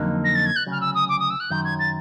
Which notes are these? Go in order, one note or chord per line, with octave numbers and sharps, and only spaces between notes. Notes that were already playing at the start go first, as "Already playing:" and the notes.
Already playing: F2 D3 F#3 A#3 D#4
A#6
A6
G#6
F#6
D2 C#3 F#3 F6
E6
D#6
D6
D#6
E6
F#6
F#2 D#3 F#3 G6
G#6
A6